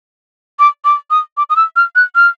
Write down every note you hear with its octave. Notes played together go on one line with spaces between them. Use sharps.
D6
D6
D#6
D6
D#6
E6
F6
F#6
F6